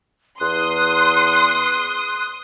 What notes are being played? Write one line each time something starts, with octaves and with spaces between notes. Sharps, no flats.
E2 C6 D#6 F#6